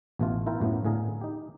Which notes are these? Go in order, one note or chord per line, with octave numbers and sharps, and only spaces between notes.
A1 B2 A3 F4
E4 F4 A#4 G5
F#2 A2 A3 B3
A2 D3 G#4 F5 A#5
D#4 G4